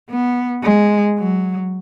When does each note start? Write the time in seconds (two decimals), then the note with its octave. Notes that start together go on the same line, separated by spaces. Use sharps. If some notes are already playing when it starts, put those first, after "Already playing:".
0.10 B3
0.63 G#3
1.18 F#3